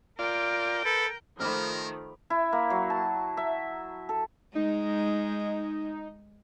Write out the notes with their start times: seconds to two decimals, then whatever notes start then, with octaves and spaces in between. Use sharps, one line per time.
0.19 F4 A#4 D5 G5
0.85 A4 B4
1.40 D#3 F3 A3 A#4 B5 D6 F6
2.30 E4
2.53 A#3
2.70 F#3
2.90 A5
3.37 E5
4.09 A4
4.55 G#3 D#4